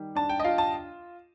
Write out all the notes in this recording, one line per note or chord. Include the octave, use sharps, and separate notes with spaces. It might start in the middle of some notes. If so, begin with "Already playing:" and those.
Already playing: D#3 G3
D4 A5
G5
D#5
F4 F5
A5